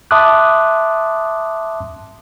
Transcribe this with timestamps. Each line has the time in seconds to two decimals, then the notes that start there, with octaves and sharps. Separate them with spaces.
0.11 E5 A5 C6 D6 D#6 F#6